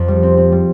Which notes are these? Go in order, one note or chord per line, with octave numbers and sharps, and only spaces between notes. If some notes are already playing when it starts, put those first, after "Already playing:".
Already playing: F2
G3
C4
C4
G3